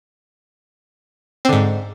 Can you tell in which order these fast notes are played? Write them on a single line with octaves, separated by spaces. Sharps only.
C4 D3 G#2